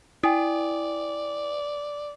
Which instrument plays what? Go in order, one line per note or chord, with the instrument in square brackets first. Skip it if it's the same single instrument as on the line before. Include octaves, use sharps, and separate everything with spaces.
[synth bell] E4 [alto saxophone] D5 [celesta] G5 G#5 D#6